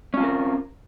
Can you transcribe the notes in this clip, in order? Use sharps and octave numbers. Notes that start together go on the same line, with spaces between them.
C4 C#4 F4 A#4